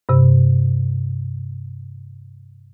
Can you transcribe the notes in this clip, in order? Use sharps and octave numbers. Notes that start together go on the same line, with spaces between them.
G2 C3